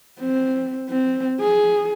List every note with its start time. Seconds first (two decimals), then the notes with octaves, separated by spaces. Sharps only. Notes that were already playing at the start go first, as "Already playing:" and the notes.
0.20 C4
0.89 C4
1.40 G#4